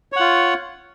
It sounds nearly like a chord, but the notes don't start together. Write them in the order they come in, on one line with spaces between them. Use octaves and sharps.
C#5 F#5 F4